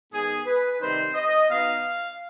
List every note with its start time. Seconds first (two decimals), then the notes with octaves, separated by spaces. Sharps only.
0.12 G#2 D#3 B3 G#4
0.46 B4
0.80 C3 D#3 G3 C4 D#4 C5
1.14 D#5
1.48 B2 B3 D#4 F5